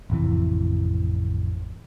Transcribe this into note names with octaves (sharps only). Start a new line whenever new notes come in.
A1 F2 C3 E3